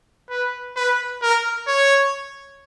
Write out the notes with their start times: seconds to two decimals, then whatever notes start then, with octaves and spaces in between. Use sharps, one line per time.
0.30 B4
0.76 B4
1.22 A#4
1.67 C#5